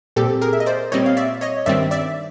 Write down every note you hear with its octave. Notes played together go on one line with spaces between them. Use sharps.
A#2 G3 C4 G4 A4
G#4 A#4
E5
D#5
C5 D5
A#2 G3 C4 C#5 D#5
F5
D5 E5
C#5 D#5
G2 D#3 G3 C4 D5 E5
D5 E5